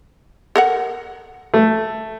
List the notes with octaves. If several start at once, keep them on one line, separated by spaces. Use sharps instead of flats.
A4 A#4 F#5
A3